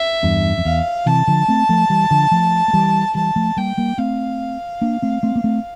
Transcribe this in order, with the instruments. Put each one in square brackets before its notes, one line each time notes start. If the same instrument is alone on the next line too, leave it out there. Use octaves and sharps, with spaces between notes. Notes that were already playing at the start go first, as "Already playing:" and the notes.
Already playing: [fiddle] E5
[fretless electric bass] E2 G2
F2
[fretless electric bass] E2 [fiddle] F5
[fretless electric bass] C3 E3 [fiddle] A5
[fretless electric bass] D3 F3
A3 C4
F3 A3
E3 G3
D3 F3
F3 A3
A3
E3 G3
[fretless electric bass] E3 G3 [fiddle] A5
[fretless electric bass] F3 A3
[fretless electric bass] G3 A#3 [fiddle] G5
[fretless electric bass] G3 A#3
[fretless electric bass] A3 C4 [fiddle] F5
[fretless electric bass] A#3 D4
A3 C4
A3 C4
A#3
A3 C4